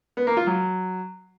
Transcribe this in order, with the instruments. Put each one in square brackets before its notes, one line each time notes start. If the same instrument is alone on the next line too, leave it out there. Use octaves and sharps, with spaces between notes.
[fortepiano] B3
A#3
F4
F#3